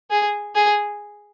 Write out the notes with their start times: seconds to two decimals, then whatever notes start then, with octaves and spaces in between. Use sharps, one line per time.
0.10 G#4
0.55 G#4